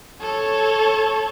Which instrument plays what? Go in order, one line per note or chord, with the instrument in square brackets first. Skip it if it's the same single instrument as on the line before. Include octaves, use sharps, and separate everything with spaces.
[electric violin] A4 C#5